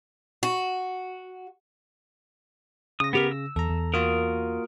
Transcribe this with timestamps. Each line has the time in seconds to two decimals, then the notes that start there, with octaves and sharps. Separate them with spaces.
0.43 F#4
3.00 C#3 D#6 A#6
3.13 B3 G4 A#4
3.31 E6
3.56 E2 A4 A#5
3.70 E2
3.94 A#3 F4 F#4 A#4 D#6